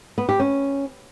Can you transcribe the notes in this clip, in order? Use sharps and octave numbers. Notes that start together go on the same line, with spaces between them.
B3
G4
C#4